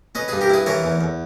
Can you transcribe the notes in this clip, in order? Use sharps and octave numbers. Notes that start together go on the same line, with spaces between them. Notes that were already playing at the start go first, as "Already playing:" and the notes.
C#4 B4 D#5
G2 G#4 B4
G4 A#4
E4 G#4 B4
E3 A#4 C#5
E2
E2